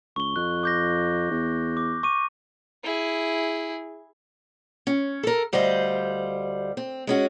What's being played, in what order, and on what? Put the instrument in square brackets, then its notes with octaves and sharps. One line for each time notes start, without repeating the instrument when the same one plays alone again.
[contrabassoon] C#2 [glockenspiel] C#6 G7
[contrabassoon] F2 [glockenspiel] F#6
[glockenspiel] D6 G6 A#6
[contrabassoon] E2
[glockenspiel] D6
C#6 D6 D#7
[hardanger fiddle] E4 G#4
[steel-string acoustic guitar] C#4
A4 A#4
D2 G3 C5 D#5 F5
C4
G#3 C#4 F#4